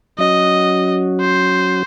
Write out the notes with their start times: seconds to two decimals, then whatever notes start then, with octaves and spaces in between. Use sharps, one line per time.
0.18 F#3 C#4 F#4 D#5
1.21 C5